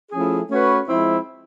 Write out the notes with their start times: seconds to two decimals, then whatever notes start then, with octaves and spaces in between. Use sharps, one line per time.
0.11 F3 A3 C#4 E4 G#4
0.49 A3 C#4 F#4 B4
0.87 F3 G#3 C4 E4